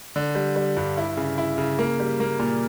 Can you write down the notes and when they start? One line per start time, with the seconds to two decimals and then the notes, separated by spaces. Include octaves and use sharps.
0.16 D3
0.35 G3
0.56 G3
0.77 G2
0.97 E4
1.17 C#3
1.38 E4
1.58 C#3
1.79 A#3
2.00 G3
2.20 A#3
2.39 A#2